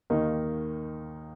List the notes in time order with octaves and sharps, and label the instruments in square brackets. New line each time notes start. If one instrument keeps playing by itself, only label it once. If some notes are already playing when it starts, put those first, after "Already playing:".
[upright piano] D#2 D#3 A#3 D#4